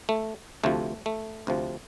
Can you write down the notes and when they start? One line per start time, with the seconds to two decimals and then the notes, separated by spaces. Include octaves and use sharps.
0.09 A3
0.64 D2 C3 F3 A3
1.06 A3
1.47 D2 C3 F3